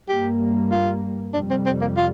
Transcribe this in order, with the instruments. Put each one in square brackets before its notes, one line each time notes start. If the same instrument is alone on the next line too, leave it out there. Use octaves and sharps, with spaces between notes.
[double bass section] G2 G3 A#3 [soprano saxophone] G4
[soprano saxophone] F4
[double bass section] F2 C3 G3 [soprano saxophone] D4
[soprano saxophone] C4
C4
A#3
F4